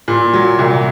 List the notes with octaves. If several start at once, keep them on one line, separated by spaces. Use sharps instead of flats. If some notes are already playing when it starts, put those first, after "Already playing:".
A#2
F#3
C2